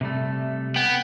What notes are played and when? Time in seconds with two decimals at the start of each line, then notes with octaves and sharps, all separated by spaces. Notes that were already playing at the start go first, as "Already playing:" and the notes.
0.01 C3 G3 A3
0.76 B3 G5